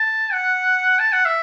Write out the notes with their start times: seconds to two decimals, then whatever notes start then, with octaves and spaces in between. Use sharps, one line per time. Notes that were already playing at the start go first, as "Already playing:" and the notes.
Already playing: A5
0.32 F#5
0.99 A5
1.13 F#5
1.25 E5